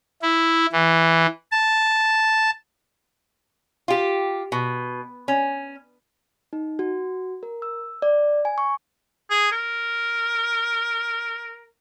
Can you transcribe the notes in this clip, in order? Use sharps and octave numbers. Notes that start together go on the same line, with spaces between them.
E4
E3
A5
F4 G4
B2
C#4
D#4
F#4
A#4
E6
D5
G#5
C#6
G#4
A#4